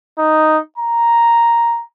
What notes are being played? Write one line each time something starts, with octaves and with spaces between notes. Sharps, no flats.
D#4
A#5